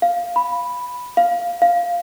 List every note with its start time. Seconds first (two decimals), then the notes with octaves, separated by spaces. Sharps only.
0.02 F5
0.36 B5
1.17 F5
1.62 F5